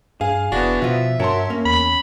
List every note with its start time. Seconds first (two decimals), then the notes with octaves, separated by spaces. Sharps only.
0.21 G2 G#4 F5
0.52 F1 B3 D4 E4 F#4
0.82 B2 F3 F4 E5
1.20 G2 F#4 A#4 C#5 A5 C6
1.50 A#3 C#4
1.66 E2 B5